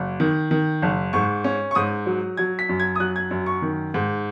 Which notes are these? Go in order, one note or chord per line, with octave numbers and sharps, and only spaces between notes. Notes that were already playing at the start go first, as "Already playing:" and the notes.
Already playing: F#1
D#3
D#3
F#1
G#2 C#6
C#4
C#6
G#2 D#6
F#3
F#3 G#6
B6
F#2
G#6
D#6
F#3 F#6
G#6
F#2
C#6
D#3
G#2